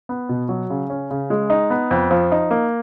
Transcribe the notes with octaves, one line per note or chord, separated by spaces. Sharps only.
B3
B2
F#3
C#3
C#4
C#3
G#3
D#4
B3
F2
F3
D#4
A#3